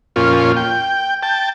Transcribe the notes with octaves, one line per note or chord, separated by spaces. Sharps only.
F2 A#2 C#4 F4
G5
G5 A5